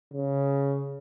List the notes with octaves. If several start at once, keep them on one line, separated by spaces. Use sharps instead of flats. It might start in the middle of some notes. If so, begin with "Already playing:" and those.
C#3